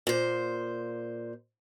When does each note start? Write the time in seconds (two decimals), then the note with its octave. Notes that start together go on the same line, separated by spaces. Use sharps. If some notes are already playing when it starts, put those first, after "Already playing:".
0.07 A#2 C5